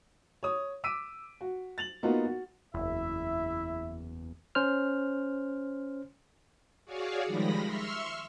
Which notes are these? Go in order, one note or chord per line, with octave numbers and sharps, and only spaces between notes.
C#5 D#6
D6 E6 B6 D7 D#7
F#4
A6 F7 F#7
A#3 B3 D#4 F4 F#4 A#4
F#4
F#1 E2 E4 E5
C#4 C5 F6
F#4 G#4 C#5 D5 F5
D#3 F3 G3 G#3 B5 A#6
E5 C6 C#6 E6 F6